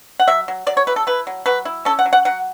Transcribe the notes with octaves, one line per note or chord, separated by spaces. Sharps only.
F#5
F#3 E5
F#3
F#3 D5
C#5
E4 B4
A4
E4 B4
F#3
F#3 B4
E4
C#4 A4
F#5
F#3
F#5
F#3 F#5